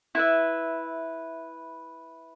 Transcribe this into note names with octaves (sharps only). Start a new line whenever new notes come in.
E4 B4 E5